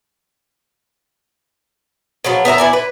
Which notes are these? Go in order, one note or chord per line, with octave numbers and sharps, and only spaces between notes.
C#3 F3 F#3 B3
B3 A#4 E5 A#5
E4 D5 G#5
B4